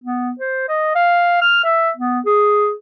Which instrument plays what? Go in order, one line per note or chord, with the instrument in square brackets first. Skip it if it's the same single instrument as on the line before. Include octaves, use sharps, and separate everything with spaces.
[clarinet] B3
C5
D#5
F5
F6
E5
B3
G#4